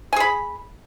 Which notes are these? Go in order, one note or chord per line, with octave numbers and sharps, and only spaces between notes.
G#4 G#5 B5